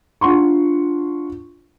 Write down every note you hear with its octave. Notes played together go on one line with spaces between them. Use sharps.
D4 F4 F#5 C6 C#6